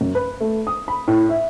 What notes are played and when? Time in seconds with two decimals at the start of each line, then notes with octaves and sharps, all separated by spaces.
0.01 F#2
0.15 B4
0.41 A3
0.67 D#6
0.88 B5
1.08 A2
1.29 E5